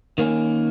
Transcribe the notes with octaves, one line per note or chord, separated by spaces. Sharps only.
D#3 A#3 C#4